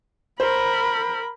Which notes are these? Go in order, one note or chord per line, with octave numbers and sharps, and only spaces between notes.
A#4 C5 B5